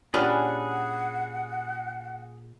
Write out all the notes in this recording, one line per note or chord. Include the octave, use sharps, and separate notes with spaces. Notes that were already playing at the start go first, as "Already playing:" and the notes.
A#2 G3 C#4 D4 G#4 F#5 B5 F6